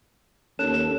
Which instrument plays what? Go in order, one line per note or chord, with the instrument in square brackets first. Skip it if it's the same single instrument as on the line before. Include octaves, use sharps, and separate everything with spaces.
[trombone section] D#2 [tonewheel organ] C#4 A4 [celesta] F#6 E7